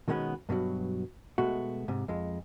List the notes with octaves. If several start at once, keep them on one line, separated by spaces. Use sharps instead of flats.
B2 D#3 G#3 A#3 B3 C#4
G2 B2 D#3 F#3
B2 G#3 A3 F#4
G#2 C3
F2 G#3